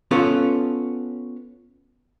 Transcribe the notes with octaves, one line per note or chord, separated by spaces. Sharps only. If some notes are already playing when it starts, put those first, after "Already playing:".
B3 C#4 F4 A4